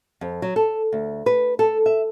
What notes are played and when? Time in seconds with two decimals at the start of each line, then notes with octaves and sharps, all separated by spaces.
0.21 F2
0.42 F#3
0.56 A4
0.93 D2
1.26 B4
1.59 A4
1.86 E5